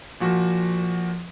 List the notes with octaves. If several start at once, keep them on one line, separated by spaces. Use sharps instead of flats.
A#2 F3 F#4